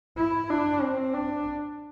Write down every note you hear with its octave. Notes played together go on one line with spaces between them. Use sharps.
E4
D4
C4
D4